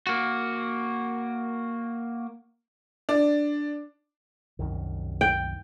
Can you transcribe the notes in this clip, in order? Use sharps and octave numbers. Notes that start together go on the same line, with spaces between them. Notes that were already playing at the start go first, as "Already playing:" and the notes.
A#3 F#4
D4
C2 F#2 D#3
G5